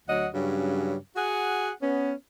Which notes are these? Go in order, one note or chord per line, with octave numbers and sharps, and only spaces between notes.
D2 F#3 D#5 F#5
G2 C#3 F#3 C#4
F#4 G#4 F#5
B3 C#4